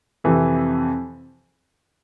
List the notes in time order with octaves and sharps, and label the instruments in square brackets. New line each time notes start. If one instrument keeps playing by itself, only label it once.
[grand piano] F2 C3 E3